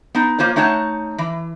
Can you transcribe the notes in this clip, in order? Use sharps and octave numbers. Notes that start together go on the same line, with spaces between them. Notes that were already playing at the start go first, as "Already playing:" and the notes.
B3 D#4
A#3 F4 C5 C#5
A3 D#4 C#5 F#5 A5
E3